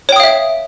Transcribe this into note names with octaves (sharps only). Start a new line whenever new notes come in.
C#5 E5 F5 G5 D#6